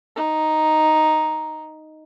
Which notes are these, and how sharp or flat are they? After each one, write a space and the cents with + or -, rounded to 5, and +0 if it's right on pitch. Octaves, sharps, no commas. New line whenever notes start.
D#4 +0